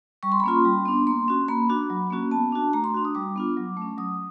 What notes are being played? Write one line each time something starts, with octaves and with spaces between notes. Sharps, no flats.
G3 C#6
C6
B5
A#3 C#4 F4 C6
G3
B3 D4
A#3 C6
C#4 F#4
A#3 B5
D4 F#4
F#3
A#3 C#4 F#4
B3 A5
D4 F#4
A3 A#5
C6
D4 F#4
D#6
G3 D6
B3 D4 F4
F#3
A3 C#4
F#3 D#6